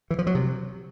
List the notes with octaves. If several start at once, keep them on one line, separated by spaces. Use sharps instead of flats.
E3
F3
F#3
C3